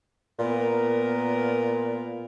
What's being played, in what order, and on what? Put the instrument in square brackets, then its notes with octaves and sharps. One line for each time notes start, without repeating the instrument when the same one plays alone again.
[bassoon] A#2 [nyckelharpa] B3 A#4